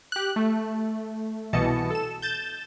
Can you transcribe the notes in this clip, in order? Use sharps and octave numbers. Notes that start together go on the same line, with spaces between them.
G4 F#6
A3
C2 B2 E3 D#5 A5 C#7
A4 E7
G6 A6 E7